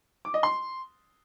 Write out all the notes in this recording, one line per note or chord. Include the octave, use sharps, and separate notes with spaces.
D6
D#5
C6